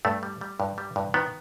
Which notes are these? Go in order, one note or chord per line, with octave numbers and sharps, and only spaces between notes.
G2 A3
G3
G3
G2
G3
G2
D#3 B3